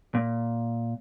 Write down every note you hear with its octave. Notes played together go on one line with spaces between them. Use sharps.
A#2